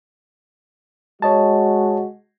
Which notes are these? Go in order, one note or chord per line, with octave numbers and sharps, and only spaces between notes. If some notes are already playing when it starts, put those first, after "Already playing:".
G#3 F#4 C#5 D#5 A5